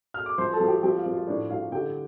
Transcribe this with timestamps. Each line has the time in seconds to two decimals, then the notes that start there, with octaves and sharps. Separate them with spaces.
0.14 F6
0.26 D6
0.38 F3 C5 C6
0.53 A4 A5
0.60 F3
0.68 G4 G5
0.82 F3 G4 G5
0.98 F4 F5
1.05 F3
1.13 F4 F5
1.27 A2 D4 D5
1.50 A2 F4 F5
1.72 D3 G4 G5